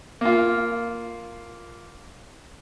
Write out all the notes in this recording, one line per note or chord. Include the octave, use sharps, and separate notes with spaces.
A#3 F4